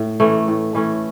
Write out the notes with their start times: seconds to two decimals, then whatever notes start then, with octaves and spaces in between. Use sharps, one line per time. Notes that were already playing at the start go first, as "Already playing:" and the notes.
Already playing: A2
0.20 E3 A3 C#4
0.48 A2
0.75 E3 A3 C#4